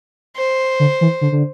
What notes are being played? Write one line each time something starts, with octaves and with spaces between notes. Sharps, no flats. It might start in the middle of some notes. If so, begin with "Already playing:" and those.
C5
D3
E3
D3
D3